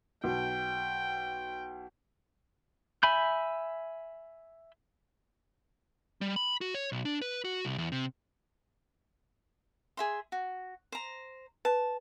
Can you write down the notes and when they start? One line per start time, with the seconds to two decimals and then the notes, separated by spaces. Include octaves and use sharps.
0.24 B1 G5
3.03 E5 G#5 B5 G6
6.21 G3
6.36 B5
6.61 F#4
6.74 C#5
6.92 B1
7.05 D4
7.22 B4
7.44 F#4
7.65 C2
7.78 E2
7.92 C3
9.97 G#4 E5 C6
10.32 F#4
10.92 C5 A#5
11.65 B4 A5